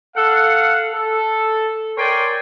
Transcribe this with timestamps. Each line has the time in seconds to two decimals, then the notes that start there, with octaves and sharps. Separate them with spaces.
0.16 A4 F5 F#5
0.94 A4
1.97 A#4 C#5 D5 G5 G#5 C6